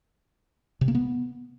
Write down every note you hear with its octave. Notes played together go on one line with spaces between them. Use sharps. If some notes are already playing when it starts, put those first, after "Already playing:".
C3
A#3
B3